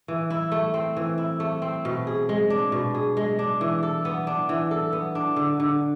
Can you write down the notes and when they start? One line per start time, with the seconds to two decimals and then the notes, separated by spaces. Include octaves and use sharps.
0.08 E3
0.30 E4
0.52 A3
0.74 C4
0.97 E3
1.18 E4
1.40 A3
1.62 C4
1.85 B2
2.07 G#4
2.29 G#3
2.50 D4
2.72 B2
2.94 G#4
3.17 G#3
3.39 D4
3.61 E3
3.83 A4
4.05 B3
4.27 D4
4.49 E3
4.71 A4
4.93 B3
5.15 D4
5.36 D3
5.60 D3